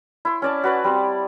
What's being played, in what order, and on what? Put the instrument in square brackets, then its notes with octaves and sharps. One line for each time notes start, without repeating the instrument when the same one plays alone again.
[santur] E4 C6
C#4 D5 A5
F#4 B4 D5
G3 C4 C6